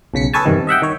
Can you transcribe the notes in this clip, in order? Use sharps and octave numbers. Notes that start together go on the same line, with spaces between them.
B1 C#3 B6 C#7
G#4 A4 B4 C#5 G#5 A5
E2 G2 C3 D#3
D#5 E5 F#5 G5
D#3 C#5